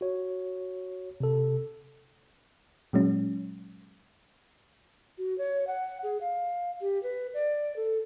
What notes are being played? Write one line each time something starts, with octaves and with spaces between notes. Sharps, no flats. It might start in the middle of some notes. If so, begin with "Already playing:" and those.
F#4 C#5
C3 A4
A#2 F#3 G#3 C#4
F#4
C#5
F#5
G#4
F5
G4
B4
D5
A4